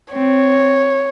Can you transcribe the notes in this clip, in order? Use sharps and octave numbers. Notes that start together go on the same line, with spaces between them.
C4 C#5